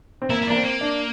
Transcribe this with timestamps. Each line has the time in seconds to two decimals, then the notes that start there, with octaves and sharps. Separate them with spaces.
0.22 C4
0.30 A#3 E4
0.42 E4
0.47 A#3 D4
0.56 C4
0.64 A#3
0.81 D4